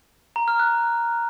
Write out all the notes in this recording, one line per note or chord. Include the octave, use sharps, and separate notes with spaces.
A#5
F6
F#6